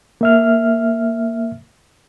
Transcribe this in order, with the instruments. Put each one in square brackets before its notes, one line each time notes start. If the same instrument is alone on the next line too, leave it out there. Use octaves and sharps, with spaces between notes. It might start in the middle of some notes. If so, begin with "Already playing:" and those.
[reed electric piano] A#3 E5 F6